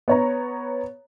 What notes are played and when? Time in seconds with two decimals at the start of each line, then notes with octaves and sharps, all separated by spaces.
0.08 B3 C#5 A#5